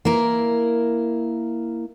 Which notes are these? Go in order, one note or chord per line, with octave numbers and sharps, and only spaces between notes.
A#3 E4 A#4